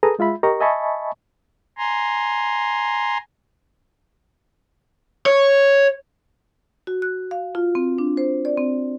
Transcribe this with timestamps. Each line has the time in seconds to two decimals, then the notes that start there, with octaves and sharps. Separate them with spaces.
0.03 G#4 A4 B4 A#5 D#6
0.19 G#3 F4 E5 B5
0.43 G4 A#4 D#5 A#5 C#6
0.60 D#5 E5 G#5 A5 B5 C#6
1.78 G#5 A#5 C6
5.26 C#5
6.87 F#4
7.02 F#6
7.31 F5
7.55 F4
7.75 C4
7.98 D4
8.17 C5
8.45 D5
8.57 C4